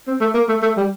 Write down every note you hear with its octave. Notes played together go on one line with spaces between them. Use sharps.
C4
A3
A#3
A3
A3
G3